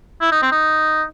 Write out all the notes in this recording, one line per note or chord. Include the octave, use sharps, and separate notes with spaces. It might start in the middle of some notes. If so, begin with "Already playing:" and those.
E4
D#4
C4
D#4